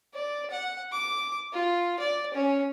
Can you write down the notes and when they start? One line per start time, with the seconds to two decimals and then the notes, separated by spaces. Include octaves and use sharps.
0.14 D5
0.50 F#5
0.92 D6
1.53 F4
1.99 D5
2.34 C#4